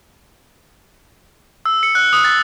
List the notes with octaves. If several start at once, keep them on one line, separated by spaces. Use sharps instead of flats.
E6
C#7
F#6
D#6
A6